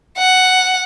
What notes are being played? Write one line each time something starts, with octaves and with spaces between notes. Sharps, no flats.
F#5